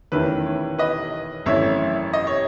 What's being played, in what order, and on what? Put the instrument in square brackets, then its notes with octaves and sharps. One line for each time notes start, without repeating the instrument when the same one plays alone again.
[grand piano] E2 D#3 A3 C#4 B4
C#5
B4 D#5
G#1 F#2 E3 A3 C#5 E5
D#5
C#5